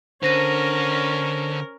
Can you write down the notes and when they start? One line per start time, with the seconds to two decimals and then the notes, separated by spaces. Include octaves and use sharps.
0.23 D3 C#4 A#4 C5 A#6 D#7